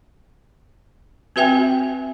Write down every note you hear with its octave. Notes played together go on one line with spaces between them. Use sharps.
C4 F#4 B4 E5 G5 G#5